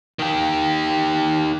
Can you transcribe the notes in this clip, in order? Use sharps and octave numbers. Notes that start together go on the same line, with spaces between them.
D#3 G4